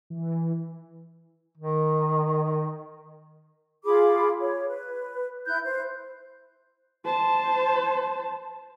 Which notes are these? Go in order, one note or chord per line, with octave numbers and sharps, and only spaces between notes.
E3
D#3
F4 G#4 B5 D6
C#5
B4
E4 F#6 G6
C5
C5 A5